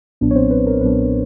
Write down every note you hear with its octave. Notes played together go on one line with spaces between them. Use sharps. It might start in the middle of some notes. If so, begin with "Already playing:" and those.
B1 A#2 F#3 B3 D4
C#5
C4 C5
B4
A#4
B1 A#2 F#3 B3 D4 B4